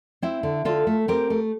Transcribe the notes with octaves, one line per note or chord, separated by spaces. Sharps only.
C4 E4
D3
D3 F4 A4
A3
C4 G4 A#4
A3